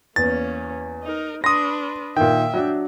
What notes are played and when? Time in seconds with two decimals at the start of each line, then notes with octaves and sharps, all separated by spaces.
0.16 E2 A#3 C#4 A6
1.03 D#4 A#4
1.44 D4 B4 C6 D#6 A#6
2.17 A#2 D#3 E5 G5
2.54 F#3 D4